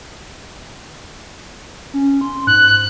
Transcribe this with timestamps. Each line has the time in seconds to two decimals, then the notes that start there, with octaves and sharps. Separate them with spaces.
1.94 C#4
2.21 C6
2.47 G#2 F#6